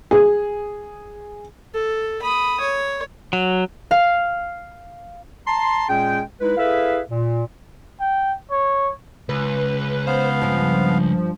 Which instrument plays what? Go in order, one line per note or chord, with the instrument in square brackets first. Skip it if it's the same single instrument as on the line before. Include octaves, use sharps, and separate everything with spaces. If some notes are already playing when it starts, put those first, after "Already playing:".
[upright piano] G#4
[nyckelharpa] A4
B5 D#6
C#5
[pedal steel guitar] F#3
[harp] F5
[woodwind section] A5 A#5 C6
A#2 G#3 C#4 G#4 G5
G#3 D#4 E4 B4
E4 G#4 A4 B4 E5 F5
A#2
[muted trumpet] G5
C#5
[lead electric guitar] C#2 [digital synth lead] B4
[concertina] B3 F5 [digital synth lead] C5
[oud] G2 C4 [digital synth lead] F3